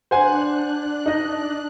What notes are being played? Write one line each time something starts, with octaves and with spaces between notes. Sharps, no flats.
D4 C5 F#5 G#5 F#6
D#4 D#5